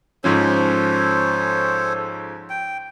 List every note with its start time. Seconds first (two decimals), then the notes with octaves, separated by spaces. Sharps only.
0.24 G#2 F3 C#4 A4 C5 C#5
2.50 G5